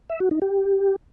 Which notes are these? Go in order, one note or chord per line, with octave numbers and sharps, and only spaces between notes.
E5
F#4
D#4
G4